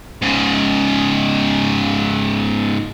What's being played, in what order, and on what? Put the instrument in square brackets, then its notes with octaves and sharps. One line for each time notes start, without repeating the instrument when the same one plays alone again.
[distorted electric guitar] G#2 C#3